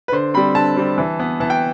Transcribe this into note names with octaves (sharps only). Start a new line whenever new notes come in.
B4
D3 C5
G3 C4 B5
D3 A5
G3 C4
E3
B3
E3 A5
G5